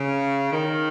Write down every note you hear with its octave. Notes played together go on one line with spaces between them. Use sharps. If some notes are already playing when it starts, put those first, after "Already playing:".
Already playing: C#3
D#3